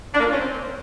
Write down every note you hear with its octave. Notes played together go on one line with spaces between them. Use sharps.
D4
A#3
F4
C#4
C4